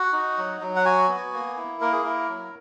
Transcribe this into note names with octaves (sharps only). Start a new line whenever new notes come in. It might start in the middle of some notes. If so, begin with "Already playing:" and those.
Already playing: F#4 F#5
D#4
F#3
F#3
F#5
F#4 G#5
B3
A#3
E4
A#3 A#4
G#4
E4 A#4
F#3